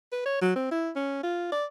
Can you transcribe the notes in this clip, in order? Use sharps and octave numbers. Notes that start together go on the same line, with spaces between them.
B4
C#5
F#3
C4
E4
C#4
F4
D5